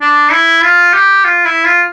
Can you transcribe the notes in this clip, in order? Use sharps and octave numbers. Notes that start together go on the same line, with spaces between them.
D4
E4
F4
G4
F4
E4
F4